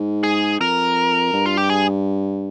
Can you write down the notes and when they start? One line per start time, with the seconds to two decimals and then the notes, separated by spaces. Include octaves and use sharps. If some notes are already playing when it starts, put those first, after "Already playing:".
Already playing: G#2
0.23 G#4
0.60 F2 A#4
1.33 G2
1.46 F4
1.57 G4
1.70 G#4